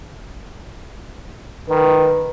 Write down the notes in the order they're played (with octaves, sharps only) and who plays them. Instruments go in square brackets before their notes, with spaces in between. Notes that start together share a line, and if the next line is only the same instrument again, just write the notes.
[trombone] D#3 [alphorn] B4